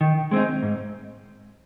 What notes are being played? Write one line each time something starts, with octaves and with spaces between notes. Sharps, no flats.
D#3
G#3 C4 D#4
G#2